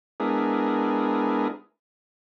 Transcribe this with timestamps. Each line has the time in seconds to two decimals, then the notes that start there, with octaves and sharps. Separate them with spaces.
0.20 G#3 B3 D4 E4 G#4 A#4